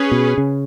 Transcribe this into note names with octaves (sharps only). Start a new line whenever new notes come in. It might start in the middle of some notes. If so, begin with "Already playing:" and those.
Already playing: C#4 G#4 B4
B2
C#3